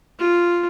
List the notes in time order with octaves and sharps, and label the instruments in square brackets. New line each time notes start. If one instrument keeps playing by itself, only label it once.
[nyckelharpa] F4